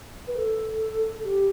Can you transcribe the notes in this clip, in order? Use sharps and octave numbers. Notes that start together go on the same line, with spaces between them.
B4
A4
G4